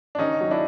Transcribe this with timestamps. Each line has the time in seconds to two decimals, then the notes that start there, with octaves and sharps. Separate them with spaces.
0.15 D4
0.18 D#3 C#4 D#4
0.41 F#3
0.51 D4 E4